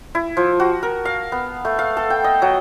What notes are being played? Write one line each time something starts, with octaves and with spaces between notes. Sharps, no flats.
E4
F3
F#4
A#4
F5
B3
A3
F5
A4
G5
D#5
F#3